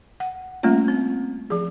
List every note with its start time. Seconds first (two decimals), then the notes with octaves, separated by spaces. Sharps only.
0.20 F#5
0.63 G3 A3 A#3 C#4 F4
0.88 C4
1.50 F3 G#4